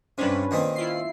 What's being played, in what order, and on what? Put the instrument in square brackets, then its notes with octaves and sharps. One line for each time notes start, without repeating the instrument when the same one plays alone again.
[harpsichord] G2 C3 [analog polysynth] C#4 D4 B4
[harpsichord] A#2 D#3 C4
[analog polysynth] E4 F4 C7